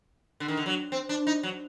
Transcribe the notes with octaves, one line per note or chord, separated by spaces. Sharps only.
D3
D#3
D3
F#3
C4
D4
D#4
F#3